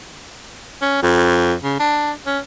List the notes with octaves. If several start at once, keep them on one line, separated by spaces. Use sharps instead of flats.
C#4
F2
C#3
D4
C#4